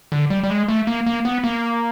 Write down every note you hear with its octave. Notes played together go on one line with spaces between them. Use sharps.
D3
G3
G3
G#3
A3
A#3
A#3
B3
A#3